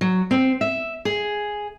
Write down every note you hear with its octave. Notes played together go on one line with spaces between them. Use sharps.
F#3
C4
E5
G#4